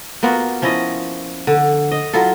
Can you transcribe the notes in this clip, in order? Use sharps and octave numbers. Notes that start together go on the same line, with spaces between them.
A#3 B3 F4 F#4
F3 C#4 E4 D#5
D3
D#5
F#3 E4 F4 A4